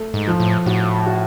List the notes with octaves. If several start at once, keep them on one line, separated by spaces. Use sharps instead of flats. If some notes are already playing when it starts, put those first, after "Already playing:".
Already playing: A3
G#2
F3
A2
A2 F#4
F#4